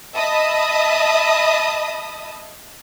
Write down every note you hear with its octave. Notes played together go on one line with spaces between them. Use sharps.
D#5 E5 A5 B5 D#6